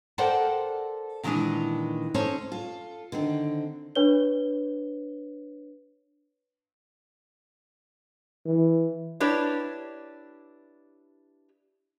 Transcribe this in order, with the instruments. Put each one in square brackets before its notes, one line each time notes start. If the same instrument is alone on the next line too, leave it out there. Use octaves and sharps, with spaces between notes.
[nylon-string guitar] A4 A#4 C5 D5 F#5 G5
A#2 D#3 E3 G#3 D4 G#4
C#4 D#4 A4 C5 C#5
[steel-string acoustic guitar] F4 A4
D3 D#3 C4
[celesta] D4 B4 C#5 G7
[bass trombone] E3
[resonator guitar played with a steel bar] D4 E4 G4 B4 C#5